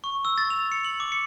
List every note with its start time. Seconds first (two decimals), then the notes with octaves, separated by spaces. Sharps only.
0.04 C#6
0.25 E6
0.38 A6
0.50 F7
0.72 C#7
0.85 F#7
1.00 D6
1.12 C#7